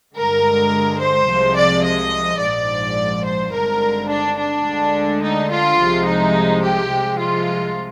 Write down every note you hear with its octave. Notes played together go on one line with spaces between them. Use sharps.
G2 D3 G#3 A#4
C5
C2 C3 F3 G#3
D5
D#5
A#1 G#2 F3 D5
C5
G#1 G2 D3 G#3 A#4
D4
D4
D2 D3 G#3
D#4
F4
C2 C3 F3 G#3
D#4
G4
C2 C3 F3 G#3
F4